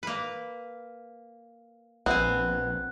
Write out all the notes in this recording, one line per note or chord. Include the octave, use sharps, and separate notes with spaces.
A#3 B4
A#1 B3 C4 G#5 F#6